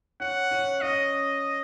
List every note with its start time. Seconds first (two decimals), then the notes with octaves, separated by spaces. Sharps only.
0.20 C#4 F#5
0.51 C#4
0.82 C#4 D#5